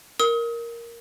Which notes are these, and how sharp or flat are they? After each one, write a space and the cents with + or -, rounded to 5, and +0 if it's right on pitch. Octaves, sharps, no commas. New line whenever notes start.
A#4 +0 D#6 +35